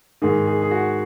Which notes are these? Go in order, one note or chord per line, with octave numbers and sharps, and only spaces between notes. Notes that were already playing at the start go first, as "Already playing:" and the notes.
G#2 D#3 G#4
G#4
G#4
F#4